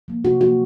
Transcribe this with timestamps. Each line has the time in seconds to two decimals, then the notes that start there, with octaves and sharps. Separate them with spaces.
0.08 F3 A#3
0.24 C3 F#4
0.41 F3 A#3 F#4